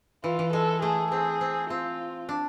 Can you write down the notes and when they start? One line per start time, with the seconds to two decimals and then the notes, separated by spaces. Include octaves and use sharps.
0.24 E3 F4
0.39 E3
0.53 G#3 A4
0.82 A3 G#4
1.12 C4 G#4
1.41 C4
1.70 C4 F4
2.29 D4